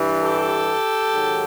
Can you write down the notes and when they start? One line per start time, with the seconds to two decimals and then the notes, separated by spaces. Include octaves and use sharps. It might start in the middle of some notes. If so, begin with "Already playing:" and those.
Already playing: G2 E3
0.22 G4 A4
1.13 G#2 D#3 F#3